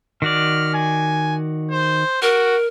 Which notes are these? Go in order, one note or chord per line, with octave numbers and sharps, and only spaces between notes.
D#3 F#4 D5 F6
G#5
C5
F#4 A#4